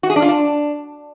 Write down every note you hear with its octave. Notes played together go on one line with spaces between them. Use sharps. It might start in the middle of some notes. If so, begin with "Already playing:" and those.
F#4
G#4
D4
F4
D4